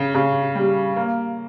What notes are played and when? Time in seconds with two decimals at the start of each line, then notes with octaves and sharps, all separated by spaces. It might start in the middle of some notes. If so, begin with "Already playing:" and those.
Already playing: C#3
0.15 C#3
0.55 G3
0.96 A#3